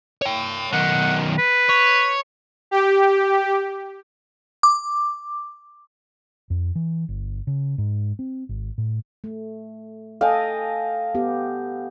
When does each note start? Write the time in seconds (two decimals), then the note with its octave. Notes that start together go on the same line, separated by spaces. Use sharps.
0.22 C#5 G5
0.72 B1 D#3 F#5
1.38 B4
1.70 C#5
2.71 G4
4.63 D6
6.50 F2
6.76 E3
7.08 G1
7.47 C#3
7.78 G#2
8.19 C4
8.49 G#1
8.78 A2
9.24 A3
10.21 A4 D#5 F5 G5 G#5
11.15 B3 G4